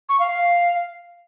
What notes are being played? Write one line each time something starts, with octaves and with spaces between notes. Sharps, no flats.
C#6
F5
F5